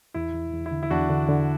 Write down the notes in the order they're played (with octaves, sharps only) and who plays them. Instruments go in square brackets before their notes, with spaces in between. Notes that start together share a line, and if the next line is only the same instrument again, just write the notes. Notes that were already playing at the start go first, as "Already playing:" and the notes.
[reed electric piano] E2 [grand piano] E4
[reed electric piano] E2
E2
[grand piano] E4
[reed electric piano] D3
[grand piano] E4
[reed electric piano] E2 [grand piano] D4 F#4
[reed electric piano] D3
D3